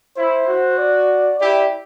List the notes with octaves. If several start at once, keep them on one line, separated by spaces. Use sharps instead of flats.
E4 C5
F#4
D5
E4 G4 D5